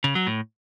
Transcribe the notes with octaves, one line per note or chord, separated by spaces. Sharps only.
C#3
F#3
A2